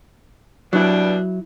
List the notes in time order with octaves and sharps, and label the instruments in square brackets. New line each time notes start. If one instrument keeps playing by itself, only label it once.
[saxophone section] G2 B2 D4 [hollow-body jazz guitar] F#3 E4